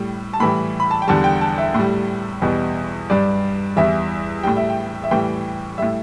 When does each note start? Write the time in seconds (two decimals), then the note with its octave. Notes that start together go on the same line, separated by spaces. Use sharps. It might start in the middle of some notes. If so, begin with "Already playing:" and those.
Already playing: A2 G3
0.33 A5
0.40 A2 E3 G3 B5
0.80 B5
0.91 A5
1.02 G5
1.08 E2 D3 G3 A5
1.24 G5
1.41 A5
1.58 E5
1.74 A2
1.79 G3
2.42 E2 B2 G3
3.10 G2 G3 D5
3.76 E2 E3 G3 E5
4.43 A2 G3 G5
4.57 E5
4.70 G5
5.04 E5
5.11 A2 E3 G3 G5
5.78 A2 G3 E5